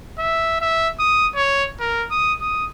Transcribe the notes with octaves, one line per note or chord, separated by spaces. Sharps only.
E5
E5
D#6
C#5
A#4
D#6
D#6